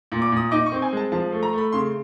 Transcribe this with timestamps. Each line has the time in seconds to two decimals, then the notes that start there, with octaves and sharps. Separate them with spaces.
0.12 A#2
0.22 D6
0.32 A#2 D#6
0.51 D#4 D6
0.66 C#6
0.72 C4
0.82 G#5
0.93 G#3 A5
1.12 F3 A5
1.32 A3
1.43 A#5
1.53 A3 B5
1.72 C#3 C6